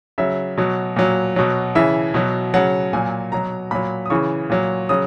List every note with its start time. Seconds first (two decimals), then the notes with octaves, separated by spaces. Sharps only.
0.18 C#3 F#3 E5
0.57 B2 F#3
0.96 A#2 F#3
1.36 B2 F#3
1.75 C#3 E3 E5
2.14 B2 F#3
2.54 C#3 F#3 F#5
2.93 A#2 F#3 G#5
3.32 B2 F#3 A#5
3.71 A#2 F#3 B5
4.06 D#6
4.10 C#3 E3 C#6
4.50 A#2 F#3
4.89 C#3 F#3 D#6